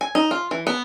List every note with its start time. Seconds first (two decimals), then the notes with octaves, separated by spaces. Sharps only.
0.01 G#5
0.15 D#4
0.31 F4
0.51 E3
0.67 B3